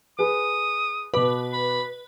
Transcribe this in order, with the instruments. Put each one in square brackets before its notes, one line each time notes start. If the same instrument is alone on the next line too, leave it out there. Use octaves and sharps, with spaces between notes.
[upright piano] G#4 B4 [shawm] D#6
[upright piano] B2 D6 [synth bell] B4
[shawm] B5